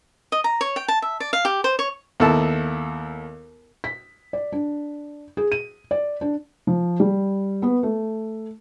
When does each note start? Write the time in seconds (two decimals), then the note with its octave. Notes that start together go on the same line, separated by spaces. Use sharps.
0.32 D#5
0.44 A#5
0.61 C#5
0.76 G5
0.88 A5
1.02 E5
1.20 D5
1.33 F5
1.45 G4
1.64 C5
1.79 C#5
2.20 D#2 B3 E4 A4 A5
3.84 B6
4.33 D5
4.52 D4
5.37 G#4
5.52 D#7
5.91 D5
6.21 D4
6.67 F3
7.00 G3
7.62 B3
7.83 A3